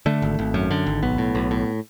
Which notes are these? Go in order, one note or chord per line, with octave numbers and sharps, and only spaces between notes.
D3 A3
G#1
G#1
F#2
D3
G#1
B1 B3
A2
B1
A2